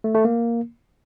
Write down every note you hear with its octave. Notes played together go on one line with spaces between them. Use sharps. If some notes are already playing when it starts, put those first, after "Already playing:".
A3
A3
A#3